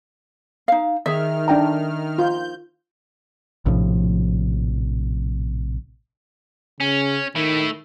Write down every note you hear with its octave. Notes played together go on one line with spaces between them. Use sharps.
D#4 F5
D#3 G#4 E5 F6
D4 G5 A#5
F4 G6
A#1 A2 C3 F3
C#3 C#4
D#3 A3 E4